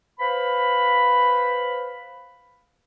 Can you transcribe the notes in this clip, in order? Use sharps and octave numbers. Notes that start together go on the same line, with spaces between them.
B4 C5 F5 B5